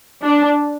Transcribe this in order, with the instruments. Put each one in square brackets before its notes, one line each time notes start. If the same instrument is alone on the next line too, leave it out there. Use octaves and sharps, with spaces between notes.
[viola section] D4